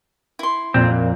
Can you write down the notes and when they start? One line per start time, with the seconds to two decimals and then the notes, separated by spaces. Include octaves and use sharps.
0.39 E4 C6
0.74 F2 A#2 C4
0.90 F2